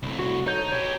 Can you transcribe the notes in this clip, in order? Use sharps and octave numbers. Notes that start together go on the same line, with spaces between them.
C2 A2
F#4
D#4 A4 C#5 G6
B2 G4 C#5